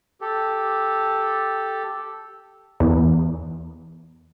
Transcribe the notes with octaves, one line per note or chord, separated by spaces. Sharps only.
G4 A4
E2